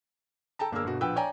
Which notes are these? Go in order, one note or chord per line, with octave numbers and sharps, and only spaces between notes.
A4 G5 A5 A#5
G1 A#3 D4 G#4 A#4 E6
G1 B2 F#4
A#1 F3 B4 F#5 G5 E6
C#5 D5 G5 G#5 A#5